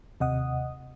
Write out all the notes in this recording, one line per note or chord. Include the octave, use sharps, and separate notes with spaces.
D#2 C3 D#5 F#5 D#6